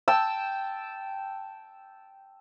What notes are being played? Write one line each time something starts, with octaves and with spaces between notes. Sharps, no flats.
G5 A5 E6